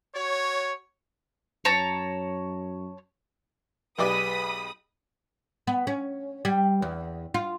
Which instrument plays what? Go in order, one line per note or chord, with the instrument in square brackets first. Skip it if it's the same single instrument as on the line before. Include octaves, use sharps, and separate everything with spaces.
[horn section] F#4 C#5
[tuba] F#2 [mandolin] C#5 A5 A#5
[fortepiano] B1 D5 [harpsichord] G#3 B3 G4 [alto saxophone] B4 [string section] B5 D#6
[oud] B3
C#4
G3
E2
F4